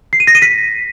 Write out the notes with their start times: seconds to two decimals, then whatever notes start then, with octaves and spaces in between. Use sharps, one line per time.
0.13 C7
0.20 D#7
0.27 A#6
0.35 D#7
0.42 B6